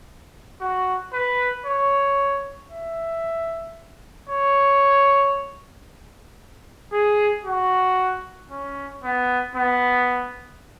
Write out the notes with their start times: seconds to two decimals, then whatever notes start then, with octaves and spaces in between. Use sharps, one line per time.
0.61 F#4
1.13 B4
1.66 C#5
2.71 E5
4.29 C#5
6.92 G#4
7.45 F#4
8.50 C#4
9.03 B3
9.56 B3